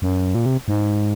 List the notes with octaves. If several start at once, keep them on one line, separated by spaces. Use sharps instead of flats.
F#2
A#2
C3
G#2